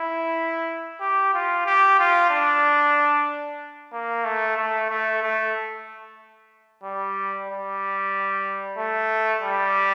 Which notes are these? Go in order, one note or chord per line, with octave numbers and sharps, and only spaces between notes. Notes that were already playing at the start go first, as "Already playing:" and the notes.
Already playing: E4
G4
F4
G4
F4
D4
A#3
A3
A3
A3
A3
G3
G3
A3
G3